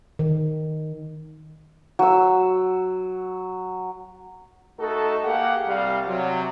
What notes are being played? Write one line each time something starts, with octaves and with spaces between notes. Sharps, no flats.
D#3
F#3 E6
A3 D#4 F#4 A4
A#3 G4 G#4 F5 F#5
C2 G3 F5
C3 F#3